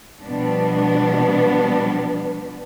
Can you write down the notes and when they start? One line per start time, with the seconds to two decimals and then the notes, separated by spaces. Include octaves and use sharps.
0.22 B2 F3 G3 B3 D4